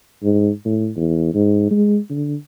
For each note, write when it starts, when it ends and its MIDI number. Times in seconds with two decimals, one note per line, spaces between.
0.23 0.50 44
0.65 0.89 45
0.96 1.30 40
1.34 1.66 44
1.70 1.97 56
2.10 2.35 50